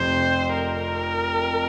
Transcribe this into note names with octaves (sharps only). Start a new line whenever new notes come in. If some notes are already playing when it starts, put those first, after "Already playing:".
Already playing: F1 F2 C3 C5
A#4